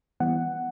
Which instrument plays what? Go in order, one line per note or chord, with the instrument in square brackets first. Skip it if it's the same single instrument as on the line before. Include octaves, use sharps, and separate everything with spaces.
[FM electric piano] E3 G3 B3 F#5